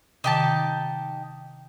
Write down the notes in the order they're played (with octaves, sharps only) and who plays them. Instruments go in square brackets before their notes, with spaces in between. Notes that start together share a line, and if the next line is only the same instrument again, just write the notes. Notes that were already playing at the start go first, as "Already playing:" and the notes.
[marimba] C3 D#3 [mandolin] D#4 G4 A5